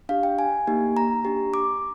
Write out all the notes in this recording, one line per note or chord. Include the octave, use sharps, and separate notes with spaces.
D4 G4 F5
G5
G#5
A#3 D#4 G4
A#5
D4 G4
D6